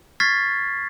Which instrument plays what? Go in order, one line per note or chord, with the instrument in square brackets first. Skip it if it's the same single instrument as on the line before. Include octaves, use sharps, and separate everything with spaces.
[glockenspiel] C#6 F6 G#6 A6 B6 C7